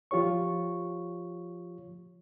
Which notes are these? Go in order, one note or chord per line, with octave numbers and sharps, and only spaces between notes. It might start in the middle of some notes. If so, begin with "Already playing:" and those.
F3 F4 G4 C#5 C#6